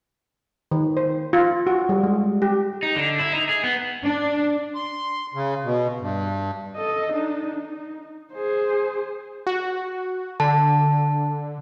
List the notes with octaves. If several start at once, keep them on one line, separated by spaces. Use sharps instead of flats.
D#3
C5
F4
F#4
G3
G#3
G4
D#4
D3
E4
D#4
G#4
B3
D4
C6
C#3
B2
G2
A4 D#5
D4 D#4
D#4
G#4 C5
F#4
D3 A5